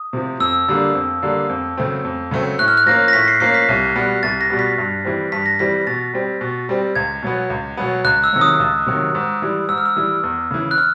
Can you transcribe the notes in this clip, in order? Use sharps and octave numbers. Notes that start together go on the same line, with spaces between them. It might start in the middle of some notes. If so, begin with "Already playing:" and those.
Already playing: D#6
C3 F3
F2 E6
D3 G3 A#3 D4
F2
D3 G3 A#3 D4
F2
C#3 F#3 A3 C4
F2
C#3 F#3 A3 C4
A2 F#6
F6
F#6
F3 A#3 C#4 A#6
A#6
A2 B6
C7
F3 A#3 C#4 C7
B6
C2
B2 G3 B3
C2 A6
A#6
B2 G3 B3
B6
G2
E3 G3 C4
G2 B6
A#6
E3 G3 C4 B6
B2 A6
G3 C4
B2
G3 C4
C#2 G#6
B2 F#3 B3
C#2
B2 F#3 B3
C#2 F#6
E6
C3 D#3 F#3
D#6
C#2
C3 D#3 F#3
G#2
E3 G3
G#2 E6
F6
E6
E3 G3
E2
C#3 E3
F#6
F6